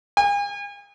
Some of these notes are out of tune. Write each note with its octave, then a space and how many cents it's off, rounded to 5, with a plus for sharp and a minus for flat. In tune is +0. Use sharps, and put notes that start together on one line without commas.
G#5 -40